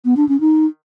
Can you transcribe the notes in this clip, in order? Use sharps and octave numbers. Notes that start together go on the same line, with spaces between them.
B3
D4
C#4
D#4